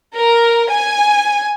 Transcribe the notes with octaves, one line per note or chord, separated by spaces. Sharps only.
A#4
G#5